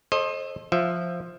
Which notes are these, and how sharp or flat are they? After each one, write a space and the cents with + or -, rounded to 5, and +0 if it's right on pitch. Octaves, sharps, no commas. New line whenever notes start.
A4 -10 C5 +30 D#5 -10
F3 +5 E5 +10